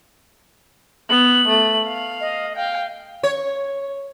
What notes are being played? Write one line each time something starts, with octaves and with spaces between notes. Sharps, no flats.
B3 F#7
A3
F5
D#5
F5 G5
C#5